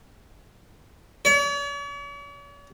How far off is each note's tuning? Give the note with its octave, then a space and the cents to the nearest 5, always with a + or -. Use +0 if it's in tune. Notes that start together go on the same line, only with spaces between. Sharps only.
C#5 +45